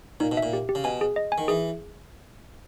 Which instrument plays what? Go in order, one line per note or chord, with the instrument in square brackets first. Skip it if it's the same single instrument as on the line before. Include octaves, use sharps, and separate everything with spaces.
[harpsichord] A#2 [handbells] D#4
[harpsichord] B2
[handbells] E5
[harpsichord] A#2
[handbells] G4
G4
[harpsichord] C#3
[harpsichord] B2 [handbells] G#5
[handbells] G#4
D#5
G#5
[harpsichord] D#3
[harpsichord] E3 [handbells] G#4